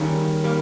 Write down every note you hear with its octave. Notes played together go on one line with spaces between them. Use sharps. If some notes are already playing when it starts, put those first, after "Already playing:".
Already playing: D#3 G3 A#3 C#4 G#4
G3 A#3